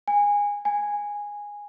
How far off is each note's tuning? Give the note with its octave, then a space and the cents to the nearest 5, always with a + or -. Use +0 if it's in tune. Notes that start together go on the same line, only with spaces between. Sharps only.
G#5 -20
G#5 -10